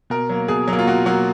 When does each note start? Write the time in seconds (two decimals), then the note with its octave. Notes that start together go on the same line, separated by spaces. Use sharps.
0.10 B2 A#4
0.29 F#3 A#3
0.48 B2 G#4
0.68 F#3
0.73 A#3
0.79 F4
0.87 B2 F#4
1.06 F#3 A#3 F#4